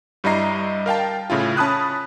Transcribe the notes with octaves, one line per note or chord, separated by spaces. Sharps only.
G2 G3 E4 D#5 A#5 C7
A#4 F5 G5 A5
A2 C#3 E4 F4
C#4 A5 B5 D#6 F#6